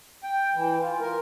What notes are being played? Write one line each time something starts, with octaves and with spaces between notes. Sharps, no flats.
G5
E3
F4
A#4